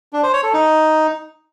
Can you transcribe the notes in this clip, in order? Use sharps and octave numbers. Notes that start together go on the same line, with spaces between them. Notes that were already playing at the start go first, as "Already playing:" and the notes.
D4
C5
C#5
A4
D#4